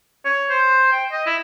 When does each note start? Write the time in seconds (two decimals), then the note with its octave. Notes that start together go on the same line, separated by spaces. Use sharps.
0.25 C#5
0.50 C5
0.92 G5
1.12 D#5
1.26 E4